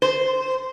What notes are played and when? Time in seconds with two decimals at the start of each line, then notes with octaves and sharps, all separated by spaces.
0.02 C5